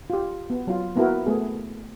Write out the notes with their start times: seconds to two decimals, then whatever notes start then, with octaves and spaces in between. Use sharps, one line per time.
0.10 F4 G4
0.50 B3
0.67 F#3 F4
0.95 A#3 B3 E4 F#4 A#4
1.26 A3 B3 G#4